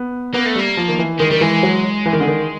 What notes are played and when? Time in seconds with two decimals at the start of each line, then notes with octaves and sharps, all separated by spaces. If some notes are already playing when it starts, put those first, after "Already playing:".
Already playing: B3
0.34 A#3 B3
0.46 A3
0.56 G3 A#3
0.77 F3
0.88 D#3
0.99 E3
1.19 D#3 G#3
1.31 D#3 G3
1.41 E3 G#3
1.63 F#3
2.06 E3
2.13 D#3
2.20 D3
2.27 D#3